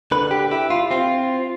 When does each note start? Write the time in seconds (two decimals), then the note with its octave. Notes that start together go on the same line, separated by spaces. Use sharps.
0.12 D3 B4
0.31 G4
0.51 E4 G4
0.70 F4
0.91 C4 F4